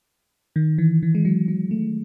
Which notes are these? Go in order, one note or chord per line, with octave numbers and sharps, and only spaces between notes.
D#3
E3
E3
G#3
F#3
F#3
A3